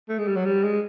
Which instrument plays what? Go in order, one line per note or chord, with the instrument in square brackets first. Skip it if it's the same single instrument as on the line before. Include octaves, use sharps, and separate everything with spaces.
[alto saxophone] A3
G#3
G3
F#3
G3
G#3